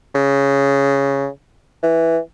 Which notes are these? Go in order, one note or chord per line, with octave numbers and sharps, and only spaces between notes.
C#3
E3